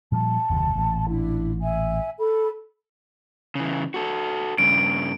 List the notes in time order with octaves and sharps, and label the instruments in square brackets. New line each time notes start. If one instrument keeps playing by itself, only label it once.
[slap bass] A#2 F3 G3 [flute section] A5
[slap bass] F#1 D#2 C3
A1 A#2
[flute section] D4 E4
E5 G#5
A4 B5
[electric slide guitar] C#3 E3
F#4 A4
[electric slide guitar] G2 C#3 [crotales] D7